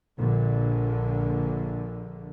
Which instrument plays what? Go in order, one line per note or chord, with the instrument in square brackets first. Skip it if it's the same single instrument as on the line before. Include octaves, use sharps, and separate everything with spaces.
[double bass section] A#1 A#2 D3